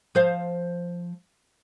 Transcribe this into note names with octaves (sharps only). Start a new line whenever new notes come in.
F3 C5 F5